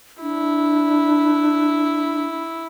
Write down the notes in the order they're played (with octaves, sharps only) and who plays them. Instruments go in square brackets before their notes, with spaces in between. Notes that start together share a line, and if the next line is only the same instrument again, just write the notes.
[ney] D4 [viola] E4